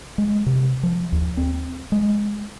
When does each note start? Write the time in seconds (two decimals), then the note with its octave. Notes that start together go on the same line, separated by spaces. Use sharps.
0.18 G#3
0.46 C3
0.83 F3
1.12 D#2
1.37 C4
1.92 G#3